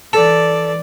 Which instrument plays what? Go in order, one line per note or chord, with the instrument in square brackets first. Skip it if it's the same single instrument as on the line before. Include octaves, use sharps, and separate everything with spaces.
[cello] E3 D5 [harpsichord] A4